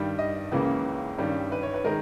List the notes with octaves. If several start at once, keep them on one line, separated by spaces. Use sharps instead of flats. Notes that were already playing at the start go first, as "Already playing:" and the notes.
Already playing: G2 D#3 G3
D#5
C#2 C#3 E3 A#3 C#4
G2 D#3 G3 C#4
B4
C#5
B4
D#3 G#3 A#4